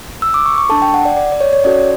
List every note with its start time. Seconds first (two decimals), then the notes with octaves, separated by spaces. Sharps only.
0.22 E6
0.34 D6
0.46 C#6
0.58 C#6
0.69 D4 A4 A5
0.82 G5
0.94 F#5
1.05 D5
1.17 D5
1.32 D5
1.41 C#5
1.53 C#5
1.64 C#4 F#4 A4 D5